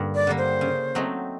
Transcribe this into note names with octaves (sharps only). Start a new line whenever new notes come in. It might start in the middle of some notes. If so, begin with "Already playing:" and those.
Already playing: G2 D3 G3 A#3
D5
D3 G3 A#3
C5
C#3
F#3 A3 C4 D#4